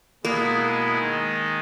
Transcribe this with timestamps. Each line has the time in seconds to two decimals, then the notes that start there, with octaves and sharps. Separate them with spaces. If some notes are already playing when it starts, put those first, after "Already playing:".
0.23 B2 G#3 A#3 B3 E4 G#4
0.98 D#3 G#3 D#4